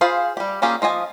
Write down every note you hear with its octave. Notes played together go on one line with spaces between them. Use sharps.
F4 G#4 C5 F5 B5
G3 G4
A#3 C#4 F4 G4 G#4
F3 F4 D#5 G#5